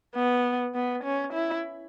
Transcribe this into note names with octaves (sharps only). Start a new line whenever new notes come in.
B3
B3
C#4
E4